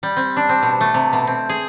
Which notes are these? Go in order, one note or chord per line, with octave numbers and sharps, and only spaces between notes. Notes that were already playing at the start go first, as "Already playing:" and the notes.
G3
C4
D4
C4
B2
A3
C3
B2
C4
G#4